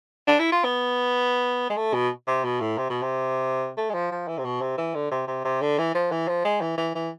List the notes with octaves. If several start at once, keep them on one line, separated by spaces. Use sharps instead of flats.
D4
E4
F4
B3
G#3
A3
B2
C3
B2
A2
C3
B2
C3
A3
G#3
F3
F3
E3
C3
B2
C3
E3
D3
C3
C3
C3
D3
E3
F3
E3
F3
G#3
E3
E3
E3